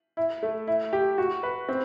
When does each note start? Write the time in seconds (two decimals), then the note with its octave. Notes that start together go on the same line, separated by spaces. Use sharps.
0.17 E4
0.43 A3
0.67 E4
0.93 G4
1.18 F#4
1.43 B4
1.69 C4